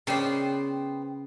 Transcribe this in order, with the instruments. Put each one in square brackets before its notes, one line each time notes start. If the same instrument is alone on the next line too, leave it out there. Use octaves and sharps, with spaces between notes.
[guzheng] C#3 D5 [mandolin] B3 C5 G5